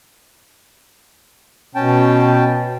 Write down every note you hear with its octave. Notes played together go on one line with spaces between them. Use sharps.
B2 C#4 G5 A5